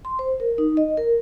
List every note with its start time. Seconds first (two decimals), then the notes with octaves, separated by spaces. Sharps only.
0.05 C6
0.19 C5
0.40 A#4
0.58 D#4
0.77 D#5
0.97 A#4